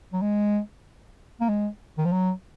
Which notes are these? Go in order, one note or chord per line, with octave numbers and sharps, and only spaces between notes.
F#3
G#3
A#3
G#3
D#3
F3
F#3